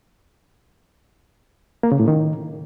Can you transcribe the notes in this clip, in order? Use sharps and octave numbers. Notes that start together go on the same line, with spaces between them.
A#3
C#3
A2
D#3